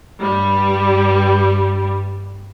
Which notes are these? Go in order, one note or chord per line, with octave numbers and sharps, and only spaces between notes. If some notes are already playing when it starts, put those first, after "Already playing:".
G2 G3